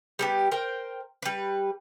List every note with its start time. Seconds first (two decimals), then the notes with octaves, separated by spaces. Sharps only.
0.19 G3 B3 G4
0.51 A#4 C5 G5
1.22 G3 B4